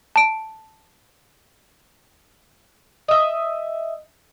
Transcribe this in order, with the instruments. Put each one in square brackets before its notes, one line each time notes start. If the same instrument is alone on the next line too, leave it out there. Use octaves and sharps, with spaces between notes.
[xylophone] A5 D7
[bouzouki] D#5 E5